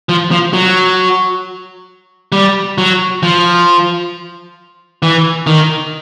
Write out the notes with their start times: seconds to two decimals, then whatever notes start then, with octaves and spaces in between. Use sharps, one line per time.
0.09 F3
0.31 F3
0.53 F#3
2.32 G3
2.78 F#3
3.23 F3
5.03 E3
5.47 D#3